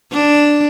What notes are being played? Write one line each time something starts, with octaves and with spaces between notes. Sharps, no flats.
D4